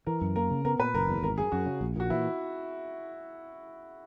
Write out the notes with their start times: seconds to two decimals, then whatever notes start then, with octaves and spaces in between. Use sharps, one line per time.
0.06 E3 A#4
0.21 F#2
0.36 A#3 A#4
0.50 C#3
0.65 B3 A#4
0.79 A#2 B4
0.94 F#1 A#4
1.08 E2
1.23 G#1 A#4
1.37 F#2 G#4
1.52 F#2 F#4
1.66 C#3
1.81 A#1
1.96 A#2 F#4
2.10 E3 E4